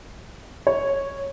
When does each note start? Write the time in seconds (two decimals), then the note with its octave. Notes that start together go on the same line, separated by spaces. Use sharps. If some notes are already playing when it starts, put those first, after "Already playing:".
0.67 C#5